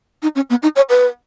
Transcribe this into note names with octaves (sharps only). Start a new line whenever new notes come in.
D#4
C#4
B3
D#4
C#5
B4